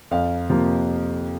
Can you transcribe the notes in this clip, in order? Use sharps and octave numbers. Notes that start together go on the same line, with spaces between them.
F2 F5
C3 F3 A#3